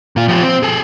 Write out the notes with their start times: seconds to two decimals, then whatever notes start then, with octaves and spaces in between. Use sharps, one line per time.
0.16 A#2 F4
0.28 F3 G4
0.43 C4
0.63 G#4 A4